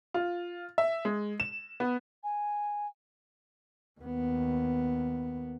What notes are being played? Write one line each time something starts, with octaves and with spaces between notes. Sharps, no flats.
F4
E5
G#3
E7
B3
G#5
D#2 B3